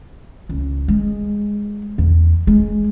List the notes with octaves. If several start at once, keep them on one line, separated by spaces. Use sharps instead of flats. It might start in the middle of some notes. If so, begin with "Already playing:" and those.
C#2
G#3
E2
G#3